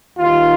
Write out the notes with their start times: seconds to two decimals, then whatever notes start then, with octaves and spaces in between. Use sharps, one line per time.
0.18 D#2 D#3 G3 F4